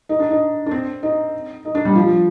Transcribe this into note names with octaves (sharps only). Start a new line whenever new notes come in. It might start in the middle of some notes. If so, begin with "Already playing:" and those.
D#4
D4
D#4
D4
C4
D#4
D#4
D4
G3
F3